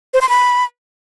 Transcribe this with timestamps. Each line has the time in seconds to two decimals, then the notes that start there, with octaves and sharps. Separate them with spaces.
0.14 C5
0.21 C6
0.29 B5